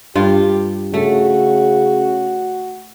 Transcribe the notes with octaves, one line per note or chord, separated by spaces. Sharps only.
G2 F4 G4
C#3 A3 F#4